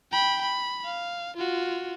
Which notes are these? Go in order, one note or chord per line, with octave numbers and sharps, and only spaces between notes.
G5 B5
B5
F5
F4 F#4